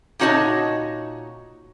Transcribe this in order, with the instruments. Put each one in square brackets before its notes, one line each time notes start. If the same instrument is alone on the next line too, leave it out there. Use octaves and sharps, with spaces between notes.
[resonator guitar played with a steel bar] A#2 D#4 F#4 C#5 D#5 A5